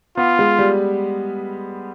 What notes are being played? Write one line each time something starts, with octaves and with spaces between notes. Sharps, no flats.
B3 F4
G#3
G3